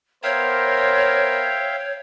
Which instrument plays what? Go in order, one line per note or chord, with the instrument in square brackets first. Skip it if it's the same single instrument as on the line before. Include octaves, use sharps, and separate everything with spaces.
[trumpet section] B3 A#4 C5 [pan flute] C#5 [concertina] E5 F5 G5